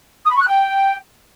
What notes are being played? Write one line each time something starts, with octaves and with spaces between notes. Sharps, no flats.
D#6
B5
C#6
F#6
G5